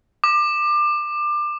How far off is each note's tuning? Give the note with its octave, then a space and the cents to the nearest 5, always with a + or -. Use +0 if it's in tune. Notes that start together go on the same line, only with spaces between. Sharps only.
D6 +25